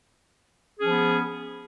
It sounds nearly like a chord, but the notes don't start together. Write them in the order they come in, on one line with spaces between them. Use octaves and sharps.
G#4 C#4 F3 B3